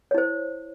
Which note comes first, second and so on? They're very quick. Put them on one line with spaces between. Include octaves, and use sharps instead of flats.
C#5 E4 C5